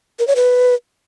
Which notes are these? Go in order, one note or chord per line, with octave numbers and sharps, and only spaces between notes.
A#4
C#5
B4